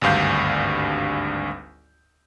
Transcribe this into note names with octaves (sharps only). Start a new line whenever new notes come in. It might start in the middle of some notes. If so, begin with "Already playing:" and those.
G#1 D2 G2 F5 G6